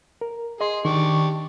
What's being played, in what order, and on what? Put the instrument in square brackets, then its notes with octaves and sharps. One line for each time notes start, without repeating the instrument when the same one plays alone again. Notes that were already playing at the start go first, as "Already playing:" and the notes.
[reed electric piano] A#4
[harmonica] G#4 [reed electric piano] D#5 C6
[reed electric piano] D#3 [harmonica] D4 G4 C#6